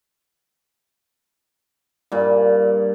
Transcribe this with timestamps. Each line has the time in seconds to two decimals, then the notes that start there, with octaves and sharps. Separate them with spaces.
2.12 G2 A#2